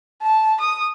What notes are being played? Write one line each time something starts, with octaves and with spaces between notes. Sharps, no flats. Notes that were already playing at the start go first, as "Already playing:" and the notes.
A5
D#6